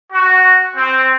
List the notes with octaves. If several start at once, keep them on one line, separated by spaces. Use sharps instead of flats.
F#4
C4